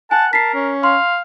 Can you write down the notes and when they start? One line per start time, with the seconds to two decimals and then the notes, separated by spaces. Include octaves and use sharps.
0.11 F#5 G#5 A5
0.33 A#4 A5 B6 C7
0.54 C#4
0.83 F5 C6